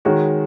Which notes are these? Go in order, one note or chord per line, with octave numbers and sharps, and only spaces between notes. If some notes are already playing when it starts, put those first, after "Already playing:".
D#3 G#3 F#4 C#5